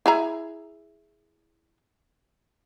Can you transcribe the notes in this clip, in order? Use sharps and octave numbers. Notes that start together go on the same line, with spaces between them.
E4 G#4 A#5